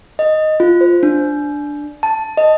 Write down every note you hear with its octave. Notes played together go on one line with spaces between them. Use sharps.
D#5
F4
C5
D4
A5
D#5